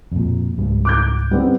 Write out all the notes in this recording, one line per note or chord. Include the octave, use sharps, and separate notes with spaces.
F2 A#2
C#2 G#2 G3
D6 F#6 G6
G3 B3 C4